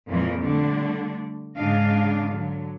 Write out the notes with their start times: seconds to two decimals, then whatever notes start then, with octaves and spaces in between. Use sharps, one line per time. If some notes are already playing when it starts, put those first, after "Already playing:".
0.10 F2 A#2 E3 F3 G#3 A#4
0.41 D3 G3 A3 D4
1.56 G#2 C#3 D4 D#5 F5
2.33 D3 F#3